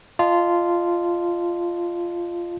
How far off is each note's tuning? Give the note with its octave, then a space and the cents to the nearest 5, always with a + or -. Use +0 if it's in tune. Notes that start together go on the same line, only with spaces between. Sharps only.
F4 -10 D#5 -30 A5 +0